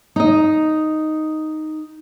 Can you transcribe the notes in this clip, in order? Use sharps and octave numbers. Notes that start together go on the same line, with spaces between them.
D#4 D#5